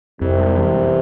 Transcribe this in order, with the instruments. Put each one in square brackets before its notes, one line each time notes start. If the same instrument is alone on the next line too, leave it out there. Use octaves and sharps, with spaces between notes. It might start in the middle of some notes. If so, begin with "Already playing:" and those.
[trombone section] C2 C3 [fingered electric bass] F2
[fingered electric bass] G#3
E3
F2